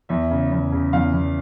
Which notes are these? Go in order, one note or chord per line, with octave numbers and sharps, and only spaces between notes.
E2 E5
C#3
E2
C#3
E2 F5
E2